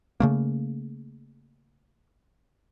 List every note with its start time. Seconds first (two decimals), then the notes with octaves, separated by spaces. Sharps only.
0.20 C#3 A3 A#3